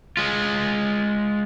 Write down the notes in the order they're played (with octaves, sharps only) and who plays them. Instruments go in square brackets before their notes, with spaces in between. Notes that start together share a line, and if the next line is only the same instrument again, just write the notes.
[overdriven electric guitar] G#3 F4